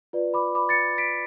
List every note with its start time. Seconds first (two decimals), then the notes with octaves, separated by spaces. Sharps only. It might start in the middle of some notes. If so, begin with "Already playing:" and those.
0.13 F4 B4 D5
0.34 B5 D6
0.55 B5 D6
0.69 A6 C#7
0.98 B6 D7